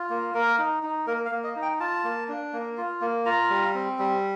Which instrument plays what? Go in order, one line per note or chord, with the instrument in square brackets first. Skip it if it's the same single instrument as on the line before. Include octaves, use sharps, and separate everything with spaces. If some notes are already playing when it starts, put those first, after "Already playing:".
Already playing: [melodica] F4
A#3
A#3 A#4
D#4
D#4
A#3 A#4
F5
A#3
D#5
D#4
G5
F4 A5
A#3
D4
A#3
F4
A#3
F4 A#5
G3
C4
G3